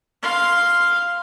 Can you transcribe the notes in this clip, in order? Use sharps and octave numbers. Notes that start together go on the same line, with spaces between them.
F5 C6